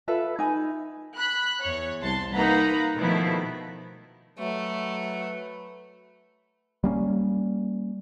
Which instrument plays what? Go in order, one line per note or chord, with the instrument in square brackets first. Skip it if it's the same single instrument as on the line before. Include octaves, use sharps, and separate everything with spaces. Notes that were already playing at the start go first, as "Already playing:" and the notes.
[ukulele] F4 A4 B4 E5
D#4 G#5 B5
[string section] B5 F#6
E2 C#5
C2 A5 C6
A#3 D#4 B4 F#5 A#5 B5
B2 D#3 F3 A3 B3 E4
[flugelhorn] F#3 [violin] A3 [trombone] B4
[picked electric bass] G3 A#3 C#4